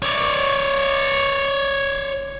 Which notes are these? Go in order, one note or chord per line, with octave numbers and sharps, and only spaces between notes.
C#5 D5